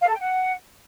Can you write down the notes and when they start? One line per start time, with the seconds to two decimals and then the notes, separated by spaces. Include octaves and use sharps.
0.01 F5
0.07 A4
0.13 G5
0.19 F#5